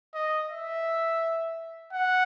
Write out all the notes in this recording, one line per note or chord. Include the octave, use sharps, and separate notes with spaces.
D#5
E5
F#5